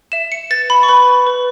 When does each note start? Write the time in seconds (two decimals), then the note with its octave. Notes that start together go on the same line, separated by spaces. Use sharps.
0.12 E5 E7
0.32 C#7
0.50 B4 A6
0.70 B5
0.83 C#6
0.88 B4 B5
1.27 B4